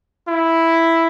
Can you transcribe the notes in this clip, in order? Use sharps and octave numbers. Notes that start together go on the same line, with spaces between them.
E4